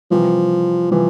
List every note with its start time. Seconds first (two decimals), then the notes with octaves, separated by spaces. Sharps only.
0.11 C3 E3 F3 G3
0.91 C3 E3 F3 G3